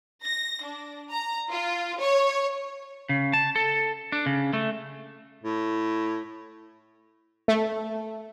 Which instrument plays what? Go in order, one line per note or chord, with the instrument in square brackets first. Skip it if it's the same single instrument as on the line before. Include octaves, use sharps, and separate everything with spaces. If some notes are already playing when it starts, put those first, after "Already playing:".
[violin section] A#6
D4
A#5
F4
C#5
[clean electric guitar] C#3
A5
A4
D4
C#3
A3
[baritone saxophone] A2
[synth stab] A3